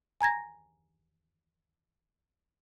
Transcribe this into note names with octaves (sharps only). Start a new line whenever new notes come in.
G#5 A#5 G#6 A#6